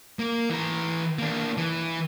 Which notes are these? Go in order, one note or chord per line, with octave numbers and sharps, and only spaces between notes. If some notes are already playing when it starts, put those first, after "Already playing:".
A#3
E3 A#5
A#3 D4
E3